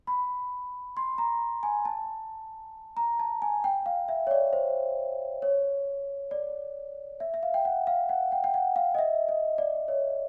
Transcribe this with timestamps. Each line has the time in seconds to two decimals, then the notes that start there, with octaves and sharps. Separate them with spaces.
0.07 B5
0.97 C6
1.18 A#5
1.63 G#5
1.85 A5
2.97 A#5
3.20 A5
3.42 G#5
3.64 G5
3.86 F5
4.09 E5
4.27 C#5
4.31 D5
4.53 C5
5.42 C#5
6.31 D5
7.20 E5
7.34 E5
7.43 F5
7.54 G5
7.65 F#5
7.87 F5
8.09 F#5
8.32 G5
8.44 G5
8.54 F#5
8.76 F5
8.95 D#5
8.99 E5
9.29 D#5
9.58 D5
9.88 C#5